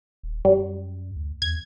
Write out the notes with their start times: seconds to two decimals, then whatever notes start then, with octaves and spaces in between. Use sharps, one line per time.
0.23 D#1
0.45 F#2 G3
1.16 D2
1.42 E2 G#6